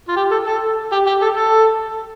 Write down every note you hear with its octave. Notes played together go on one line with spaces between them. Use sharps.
F4
G4
A4
A4
G4
G4
A4
A4